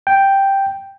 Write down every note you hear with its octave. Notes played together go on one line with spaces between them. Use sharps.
G5